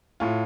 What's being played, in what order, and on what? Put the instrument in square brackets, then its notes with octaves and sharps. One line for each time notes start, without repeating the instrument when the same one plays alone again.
[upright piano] A2 F4